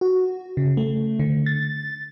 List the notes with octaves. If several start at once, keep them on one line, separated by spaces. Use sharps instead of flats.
F#4
C#3
A3
D3
A6